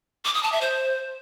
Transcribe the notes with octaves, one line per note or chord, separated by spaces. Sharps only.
D6
D#6
A5
E5
C5